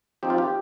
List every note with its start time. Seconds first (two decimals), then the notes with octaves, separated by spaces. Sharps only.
0.23 F3 C4 D#4 G4
0.30 F4
0.38 G4